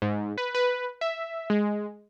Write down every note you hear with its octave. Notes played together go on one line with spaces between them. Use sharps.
G#2
B4
B4
E5
G#3